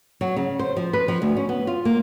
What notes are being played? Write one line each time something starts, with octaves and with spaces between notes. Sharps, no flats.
F#3
C#3
C5
F3
B4
F3
D2
C#4
B3
F4
A#3